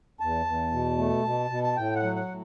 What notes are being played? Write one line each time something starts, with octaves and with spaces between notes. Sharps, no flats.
E2 A5
E2
B2
A3
B2
B2
A5
A2 G5
F#5
F#3
F#5
A2